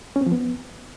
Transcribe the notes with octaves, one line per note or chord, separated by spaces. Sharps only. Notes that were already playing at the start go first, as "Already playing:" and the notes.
C#4
C4
F3
B3